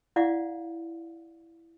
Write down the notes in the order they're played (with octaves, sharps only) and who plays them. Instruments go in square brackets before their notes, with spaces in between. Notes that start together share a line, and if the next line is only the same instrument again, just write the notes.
[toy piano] E4 D5 F5 F#5